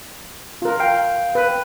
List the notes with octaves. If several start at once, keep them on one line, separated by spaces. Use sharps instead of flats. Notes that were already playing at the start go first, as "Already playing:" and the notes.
F4 A#4
F5 G5
B4